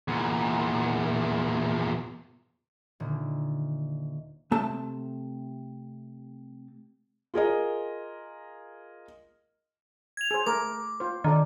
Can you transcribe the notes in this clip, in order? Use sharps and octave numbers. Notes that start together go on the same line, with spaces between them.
E2 A#2
D#1 D3
C3 A3 A5
F4 G#4 A#4 D#5
G#6 F7
G#4 C5
A3 A#4 D6
F4 C5
D#3 D4 A4 D5